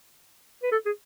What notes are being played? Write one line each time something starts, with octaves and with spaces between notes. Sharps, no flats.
B4
A4
G#4